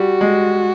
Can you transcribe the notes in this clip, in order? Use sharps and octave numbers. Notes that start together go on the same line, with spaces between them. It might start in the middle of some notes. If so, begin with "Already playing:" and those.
Already playing: G3 F#4
G#3